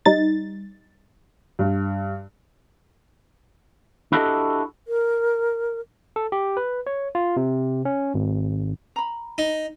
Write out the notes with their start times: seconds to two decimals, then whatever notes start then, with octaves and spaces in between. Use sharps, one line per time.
0.06 G3 D#4 A6
1.59 G2
4.12 D4 E4 F#4 G4 A4 D#5
4.88 A#4
6.16 A4
6.32 G4
6.57 B4
6.87 C#5
7.15 F4
7.36 C3
7.85 C#4
8.14 G#1
8.96 A#5 B5
9.38 D#4